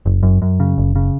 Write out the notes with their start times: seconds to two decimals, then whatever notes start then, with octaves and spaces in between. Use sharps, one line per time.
0.06 F#1
0.23 F#2
0.42 F#2
0.60 C#3
0.78 F#1
0.96 C#3